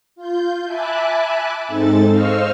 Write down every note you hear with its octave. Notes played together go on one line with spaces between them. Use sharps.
F4 G6
E5 G#5 A5 B5 D6 F#6
G#2 G#3 C4 D#4 A4 A6
C5 D#5 F5 C#6 E6 F6